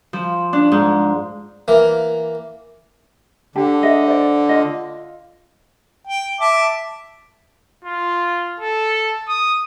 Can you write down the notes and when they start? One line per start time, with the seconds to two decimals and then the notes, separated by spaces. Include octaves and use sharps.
0.13 F3
0.53 D4
0.72 G#2
1.68 E3 A#3
3.55 D3 D4 G4 A5
3.82 G#4 D#5 E5
4.07 C5 D5
4.49 F4 D#5
6.07 G5
6.41 E5 A5 D6
7.84 F4
8.60 A4
9.28 D#6